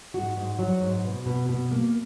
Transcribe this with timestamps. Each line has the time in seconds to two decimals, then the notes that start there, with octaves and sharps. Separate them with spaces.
0.14 G#2 F#4
0.37 G#2
0.59 F#3
0.82 G#2
1.04 B2
1.26 B2
1.49 B2
1.71 A#3